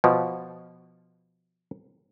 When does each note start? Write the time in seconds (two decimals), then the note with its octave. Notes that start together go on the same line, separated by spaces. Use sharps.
0.04 B2 F3